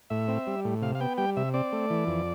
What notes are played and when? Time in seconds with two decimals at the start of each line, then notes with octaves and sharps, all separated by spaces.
0.10 A2 E5
0.28 C4
0.47 G3
0.65 A2
0.82 C3 F5
0.95 F5
1.01 B3 G5
1.18 G3 G5
1.37 C3 E5
1.54 C4 D5
1.73 A3
1.90 E3
2.07 F2